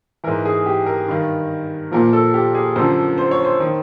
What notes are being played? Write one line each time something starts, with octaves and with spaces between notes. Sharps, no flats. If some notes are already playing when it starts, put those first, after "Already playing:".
G#2 E3 A#4
G#4
G4
A#4
G2 D#3
A#2 F3 A#4
A4
G4
G#4
F#2 D3 F3 C5
C5
C#5
C5
D#3